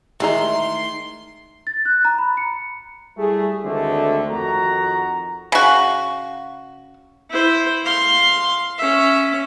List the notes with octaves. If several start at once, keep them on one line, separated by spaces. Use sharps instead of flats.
D#3 E3 G#3 A3 D#4 E5 C6
A6
F#6
A#5
B5
C#7
G3 A3 E4 G#4
D2 D3 D#3 G#3 A3 C4
F2 D#3 F#4 A#5
C#3 F#4
E4 C5
F5 C6
C#4 E5